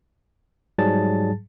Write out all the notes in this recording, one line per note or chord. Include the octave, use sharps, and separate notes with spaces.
G#2 F#3 G3 G#4 A5 A6